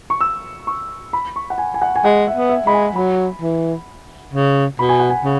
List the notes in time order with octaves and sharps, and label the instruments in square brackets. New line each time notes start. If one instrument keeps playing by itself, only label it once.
[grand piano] C#6
E6
C#6
B5
C#6
F#5
G#5
G#5
F#5
G#5
[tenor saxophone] G#3 [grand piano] F#5
[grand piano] E5
[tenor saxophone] B3
[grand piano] E5
[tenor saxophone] G#3 [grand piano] B5
[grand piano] G#5
[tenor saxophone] F#3 [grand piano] B5
[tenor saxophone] E3
C#3
[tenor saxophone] B2 [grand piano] B5
[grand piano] G#5
F#5
G#5
[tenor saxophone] C#3